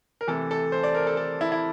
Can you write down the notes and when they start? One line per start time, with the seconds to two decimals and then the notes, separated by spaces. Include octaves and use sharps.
0.21 A#4
0.27 C3 E3 A3 A4
0.51 A4
0.72 C5
0.83 D5
0.95 A#4
1.07 A4
1.17 A4
1.41 E4
1.52 E4